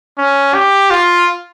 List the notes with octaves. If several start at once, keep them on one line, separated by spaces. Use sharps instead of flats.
C#4
G4
F4